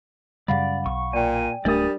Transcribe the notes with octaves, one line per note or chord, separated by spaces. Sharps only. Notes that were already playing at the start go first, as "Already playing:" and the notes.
F#2 C#3 G3 D5 F5 F#5 B5
B1 C#6
A#2 D5 G5 G#5
D1 G3 A3 D4 A#4 D5 D#6 A6